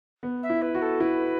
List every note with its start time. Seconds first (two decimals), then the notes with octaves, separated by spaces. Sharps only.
0.23 B3
0.42 E5
0.50 E4
0.61 B4
0.75 F#4
0.81 A4
1.00 E4 B4